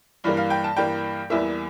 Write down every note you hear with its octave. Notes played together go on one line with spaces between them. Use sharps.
G2 E3 G3 A#3
F5
G5
A5
G2 E3 G3 A#3 G5
E2 E3 G3 A#3 E5